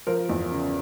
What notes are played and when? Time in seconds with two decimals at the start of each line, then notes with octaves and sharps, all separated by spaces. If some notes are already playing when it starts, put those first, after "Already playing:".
0.07 F3 A#4 C5
0.29 E2
0.51 C#3